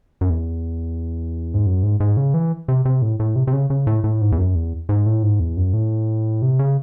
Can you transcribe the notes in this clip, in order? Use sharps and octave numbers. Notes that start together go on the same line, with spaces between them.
F#2
E2
G#2
F#2
G#2
G#2
C#3
E3
C3
C3
A2
A2
C3
C3
C#3
C#3
A2
A2
G#2
E2
F#2
E2
G#2
A2
G#2
E2
F#2
A2
C3
C#3